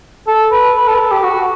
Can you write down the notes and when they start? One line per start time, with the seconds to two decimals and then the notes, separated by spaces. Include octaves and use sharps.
0.27 A4
0.52 B4
0.76 B4
0.88 A4
0.95 B4
1.00 A4
1.11 G4
1.23 F#4